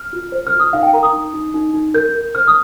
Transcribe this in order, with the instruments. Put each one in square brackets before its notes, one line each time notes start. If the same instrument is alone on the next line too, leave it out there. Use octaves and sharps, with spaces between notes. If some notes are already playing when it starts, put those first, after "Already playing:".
Already playing: [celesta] F6
F4
C5
F6
F4
D#6
D#4 F5
G5
A#4 A#5
D#6
D#4
D#4
D#4
D#4
A#4 G6
A#4
C5 F6
D#6